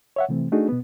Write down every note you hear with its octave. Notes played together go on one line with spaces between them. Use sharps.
C#5 E5 F#5
C3 E3 A3 C4
A3 D4 D#4 F#4 G#4
B2 B3